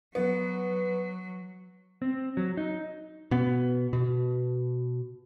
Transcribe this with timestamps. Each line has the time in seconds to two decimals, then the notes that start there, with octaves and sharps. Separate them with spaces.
0.15 F#3 B3
2.02 C4
2.37 F#3
2.57 D#4
3.31 B2 B3
3.93 B2